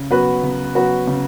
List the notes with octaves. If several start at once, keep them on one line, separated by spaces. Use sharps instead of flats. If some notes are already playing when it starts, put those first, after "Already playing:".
Already playing: C#3
F#3 B3 F#4 B4
C#3
F#3 B3 F#4 B4
C#3